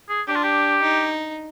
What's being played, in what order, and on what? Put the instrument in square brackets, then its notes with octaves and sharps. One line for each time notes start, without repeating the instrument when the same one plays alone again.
[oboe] G#4
[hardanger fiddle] D4 [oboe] G4
[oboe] F4
G4
[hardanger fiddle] D#4